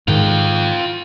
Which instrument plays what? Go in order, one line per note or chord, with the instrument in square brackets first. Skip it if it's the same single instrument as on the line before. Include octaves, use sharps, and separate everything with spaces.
[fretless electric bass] G#2 D#3 [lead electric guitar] F4 G5